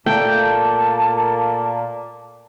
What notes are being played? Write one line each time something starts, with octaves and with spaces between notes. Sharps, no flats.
A#2 A3 A#3 G5 A5